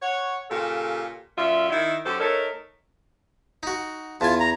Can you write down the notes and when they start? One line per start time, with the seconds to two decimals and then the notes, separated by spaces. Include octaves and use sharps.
0.02 C#5 F#5
0.50 A#2 C#3 G4 A4
1.38 F#2 A#2 F4 E5
1.70 D#3 E4
2.05 F#2 G4 A4 C5
2.20 A3 D#4 A4 A#4 C#5
3.63 D#4 F#4
4.21 E2 F4 G#5 A5
4.40 A#5